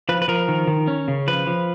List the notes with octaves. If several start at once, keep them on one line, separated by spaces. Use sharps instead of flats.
F3 B4
B4
F3 A#4
D#3
D#3
C#4
C#3
F3 B4
F3